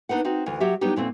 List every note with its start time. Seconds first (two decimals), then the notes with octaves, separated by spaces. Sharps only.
0.09 B3 D4 D#4 B4 F#5
0.25 C4 D#4 F#4
0.46 D2 E3
0.60 F#3 G4 E5
0.81 F#3 G3 B3 D4 D#4 G4
0.96 F2 A#2 A3 B3 C4